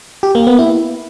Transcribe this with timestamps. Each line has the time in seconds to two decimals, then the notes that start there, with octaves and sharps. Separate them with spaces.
0.23 G4
0.35 A#3
0.47 B3
0.59 E4